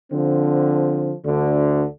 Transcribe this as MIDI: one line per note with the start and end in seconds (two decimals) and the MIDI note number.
0.12 1.13 50
0.12 1.13 53
0.12 1.13 60
1.26 1.85 38
1.26 1.85 50